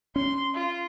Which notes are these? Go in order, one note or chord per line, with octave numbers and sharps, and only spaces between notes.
C#4 C6
F4